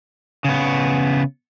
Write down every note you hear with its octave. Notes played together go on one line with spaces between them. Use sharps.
C#3 B3